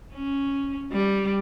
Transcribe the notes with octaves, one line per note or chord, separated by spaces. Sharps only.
C#4
G3